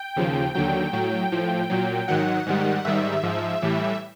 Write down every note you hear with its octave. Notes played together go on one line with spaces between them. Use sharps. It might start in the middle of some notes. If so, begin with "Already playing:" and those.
Already playing: G5
D#2 C#3 F3
D#2 D3 F#3 G5
A2 F#3
A2 F3
A#2 F#3
G#2 D#3 F#3 F#5
G#2 D#3 G3
G#2 D#3 G3 E5
G#2 F3
A2 E3 G3